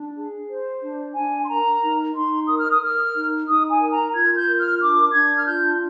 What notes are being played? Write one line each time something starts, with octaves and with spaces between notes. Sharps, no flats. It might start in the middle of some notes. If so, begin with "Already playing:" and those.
Already playing: D4
G#4
C5
D4
D4 G#5
C6
A#4 A#5
D#4
D#4 C6
A#4 D#6
F6
D#6
A#4 F6
D#4
D#4 D#6
G#5
A#4
A#5
F4 G#6
G6
A#4
F6
D4 D6
D4 G#6
F6
F4 G6